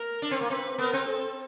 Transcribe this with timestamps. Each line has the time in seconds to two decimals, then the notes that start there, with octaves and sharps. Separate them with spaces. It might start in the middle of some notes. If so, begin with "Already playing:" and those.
Already playing: A#4
0.22 D4
0.31 C4
0.41 A#3
0.50 C4 B4
0.78 B3 A#4
0.93 C4
1.07 A4